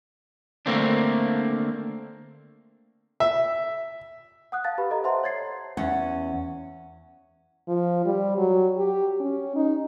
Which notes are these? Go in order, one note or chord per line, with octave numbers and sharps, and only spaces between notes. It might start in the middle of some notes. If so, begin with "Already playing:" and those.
D3 A3 A#3 C4 D4
E5
F#5 D#6 F#6
F5 A5 A6
G4 B4 B5
A4 D#5 A#5
C5 E5 F#5 A5 C6
C#5 G#6 A6 C7
E2 C#4 F#5
F3
G3
F#3
G4
C#4
D#4